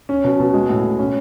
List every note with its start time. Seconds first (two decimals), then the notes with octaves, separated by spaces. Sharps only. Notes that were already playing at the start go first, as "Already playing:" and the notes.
0.09 C#4
0.24 B2
0.40 B2
0.54 G#3
0.69 A2
0.83 A2
0.99 C#4